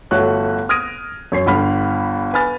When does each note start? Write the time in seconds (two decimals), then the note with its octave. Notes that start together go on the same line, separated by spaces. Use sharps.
0.11 G1 A3 F#4 C#5 F#6
0.69 D#6 F6 G#6 A#6 D7 D#7
1.32 F#2 C#5 C7
1.46 G1 G2 B5 F6
2.33 B4 G#5 B5 F6 A6